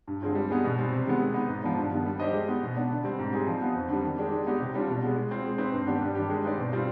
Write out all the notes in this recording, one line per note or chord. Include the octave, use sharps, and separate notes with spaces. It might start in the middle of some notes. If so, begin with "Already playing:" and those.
G2
D3 G#3 C4 F4
G3
B3 D#4 G#4
B2
G3 C4
C3
D#3 G#3 B3
G#3
B3 D#4
G#2
F3 B3 D4
G2
D#3 G3 B3
G3
D4 G4 C5 D#5
G#3
B3 D#4
B2
B3 D4
D3
G3 C4
G#2
G3 C4 D#4 G#4
F3
B3 D#4
F2
D3 G3
D#3
G#3 D4 G4
G#3
B3 D#4 G4
C3
G3 D4 F4
B2
G#3 B3
G#3
C4 F4
G#3
C4 D#4 B4
G2
D#3 B3 D4 G4
G2
D#3 G3 D4 G4
G#3
C4 D#4 B4 D5
B2
G3 C4 F4